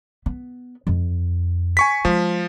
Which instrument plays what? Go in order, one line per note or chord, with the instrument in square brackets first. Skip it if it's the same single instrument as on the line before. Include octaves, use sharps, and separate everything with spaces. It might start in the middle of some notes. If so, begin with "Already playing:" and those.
[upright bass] B3
F2
[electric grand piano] G#5 C#6 B6
[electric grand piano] F3 [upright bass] G#3